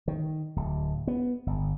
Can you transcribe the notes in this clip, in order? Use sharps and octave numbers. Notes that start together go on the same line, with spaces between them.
D#3
D1
B3
G1